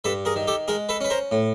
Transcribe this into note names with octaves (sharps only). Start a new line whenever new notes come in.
G2 A4 B4
G#4 A#4
D#3
G4 A4
G#3 G#4 A#4
A4 B4
C#4 B4
A#4 C5
A2